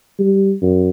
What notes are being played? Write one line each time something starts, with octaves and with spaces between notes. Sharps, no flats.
G3
F#2